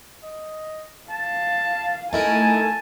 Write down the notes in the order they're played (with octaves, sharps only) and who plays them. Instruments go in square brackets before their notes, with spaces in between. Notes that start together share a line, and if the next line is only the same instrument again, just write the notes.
[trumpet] D#5
[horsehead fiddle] F5 [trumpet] A5
[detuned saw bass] A3 [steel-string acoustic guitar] D#4 E4 A#4 [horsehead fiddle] G#5 [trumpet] A5